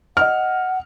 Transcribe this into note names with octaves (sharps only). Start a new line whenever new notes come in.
D#5 F#5 F6